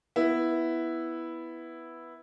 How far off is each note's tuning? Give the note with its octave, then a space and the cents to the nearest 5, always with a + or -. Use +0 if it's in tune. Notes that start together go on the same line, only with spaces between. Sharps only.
B3 +0 E4 +0